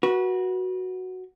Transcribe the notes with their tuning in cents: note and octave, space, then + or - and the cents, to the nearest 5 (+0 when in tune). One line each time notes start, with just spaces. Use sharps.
F#4 +0 B4 -30